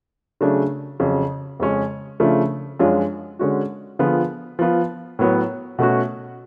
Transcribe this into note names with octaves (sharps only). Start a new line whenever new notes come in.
C#3 F#3 A3 D4 G#4
F2 C#3 F#3
F2 C#3 G#3 C#4
C#3 F3 A3 D4
F#2 F3 G#3 D4 F4
D3 G#3 C#4 F#4
D3 F3 B3 F4 G#4
F3 B3 F4
A2 F#3 B3
B2 A3 C#4 F#4